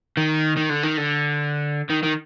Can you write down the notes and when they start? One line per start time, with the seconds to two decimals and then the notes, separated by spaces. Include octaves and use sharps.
0.17 D#3
0.57 D#3
0.70 D3
0.83 D#3
0.97 D3
1.90 D#3
2.03 D#3